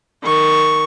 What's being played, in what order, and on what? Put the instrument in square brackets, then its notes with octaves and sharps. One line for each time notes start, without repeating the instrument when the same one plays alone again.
[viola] D#3 C#6